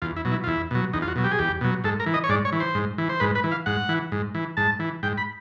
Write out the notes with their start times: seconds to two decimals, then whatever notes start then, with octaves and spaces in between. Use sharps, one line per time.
0.02 E2 F4
0.16 E4
0.25 B2 F#3
0.32 E4
0.44 F4
0.47 E2 E4
0.71 B2 F#3
0.93 E2 D#4
1.02 F4
1.08 F#4
1.16 B2 F#3
1.24 G4
1.31 G#4
1.39 E2 G4
1.61 B2 F#3
1.84 G#2 A4
2.00 A#4
2.06 E3
2.14 D#5
2.24 C#5
2.29 G#2 D5
2.45 C#5
2.52 E3
2.60 C5
2.75 G#2
2.98 E3
3.09 C5
3.20 G#2 B4
3.35 B4
3.44 E3
3.52 F5
3.66 G#2 F#5
3.89 E3
4.12 G#2
4.35 E3
4.57 G#2 A5
4.80 E3
5.03 G#2 G5
5.18 B5